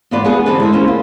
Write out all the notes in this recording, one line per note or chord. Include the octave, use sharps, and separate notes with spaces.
E2 G#2 B3 F4 B4 D5
B3 D4 G#4 B4
D3 E3 C4 D4 A4 B4
G#3 E4
A#3 C#4 C5
F4